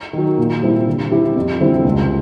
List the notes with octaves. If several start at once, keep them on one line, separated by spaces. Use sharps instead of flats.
D#3 F#3
A#2
G3 C4 E4
D3
G3 C4 E4 G4
F2
D3 G3 C4 E4
C#2